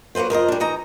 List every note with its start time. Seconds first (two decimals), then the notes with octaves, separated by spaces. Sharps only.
0.15 F#3 A#3 C4 B4 C5
0.30 F2 A#4 C5 D#5
0.48 G3 D4
0.60 E3 D#4 A#5